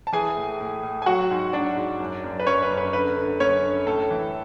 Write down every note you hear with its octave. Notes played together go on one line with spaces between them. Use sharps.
A5
E3 G#4 G#5
A2
A2
A2
G#5
F#3 F#4 F#5
G#2
F#3 D4 D5
G#2
F#2
F#2
B4
F#2 C#4 C#5
B4
F#2
B4
D3 B4
D3
F#2 C#4 C#5
D3
A2 A4
E3